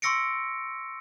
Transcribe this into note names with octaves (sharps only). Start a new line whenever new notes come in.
C6 C#6 E6 A#6 C#7 D7